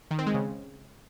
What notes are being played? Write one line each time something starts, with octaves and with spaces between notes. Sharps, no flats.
D#3
C4
G#3
C#3